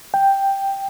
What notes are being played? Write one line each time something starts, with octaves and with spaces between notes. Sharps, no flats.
G5